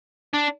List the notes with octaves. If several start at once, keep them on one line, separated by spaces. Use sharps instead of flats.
D4